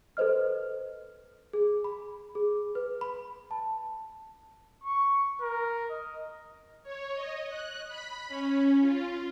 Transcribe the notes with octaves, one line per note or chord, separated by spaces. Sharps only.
A4 B4 C5 D#5 F6
G#4
B5
G#4
B4
B5
A5
C#6
A#4
D#5
C#5
D#5
F#6
B5
C#4
F4